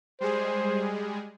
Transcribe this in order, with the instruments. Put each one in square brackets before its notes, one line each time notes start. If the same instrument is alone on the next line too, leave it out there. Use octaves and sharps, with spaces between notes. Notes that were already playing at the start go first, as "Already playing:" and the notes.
[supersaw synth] G3 G#3 G#4 [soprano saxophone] C5